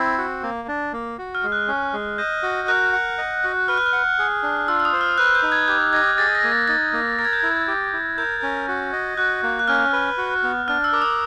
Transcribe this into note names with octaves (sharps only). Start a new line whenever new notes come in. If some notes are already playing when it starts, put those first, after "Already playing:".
Already playing: C4 E4
F#4
A#3
D4
A#3
F#4
F6
G#3
F#6
C#4
G#3
D#5 G6
F#4
A#4 F#6
F#5
D#5
F#4
B4 F6
F#6
F6
F#5
G#4
D4
F4 E6
E6
D#6
C5
F6
B4 F#6
G6
D#4
G#6
G4 G6
D#5 G#6
G#4 A6
A#6
A#3
A6
D#4 A6
A#3
A#4 A6
G#6
G6
E4 G#6
G4
E4
A#4 G6
C#4
F#4
D#5
F#4 F#6
A#3
F#6
C#4 F6
B4
F#4
B3
D4 F6
E6
A#4 D6
D#6